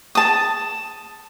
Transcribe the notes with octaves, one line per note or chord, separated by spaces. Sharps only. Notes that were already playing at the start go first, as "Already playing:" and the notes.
A5 D#6